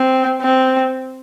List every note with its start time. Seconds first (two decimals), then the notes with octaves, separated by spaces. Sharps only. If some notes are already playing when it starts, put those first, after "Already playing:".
Already playing: C4
0.42 C4